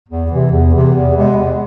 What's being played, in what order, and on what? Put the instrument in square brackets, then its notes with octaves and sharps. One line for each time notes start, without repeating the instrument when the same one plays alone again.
[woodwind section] E2
C3 E3
E2
C3 E3
E2
C3 G#3 B3
E2